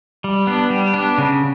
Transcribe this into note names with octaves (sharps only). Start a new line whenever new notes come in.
G3
B3 D4
G3
B3 D4
C#3